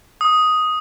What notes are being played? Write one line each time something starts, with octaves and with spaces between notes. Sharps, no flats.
D#6